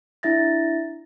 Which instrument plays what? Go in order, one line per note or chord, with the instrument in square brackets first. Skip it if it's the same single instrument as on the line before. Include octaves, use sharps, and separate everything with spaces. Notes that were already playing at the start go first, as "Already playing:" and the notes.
[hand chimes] D4 E4 E5 A6 A#6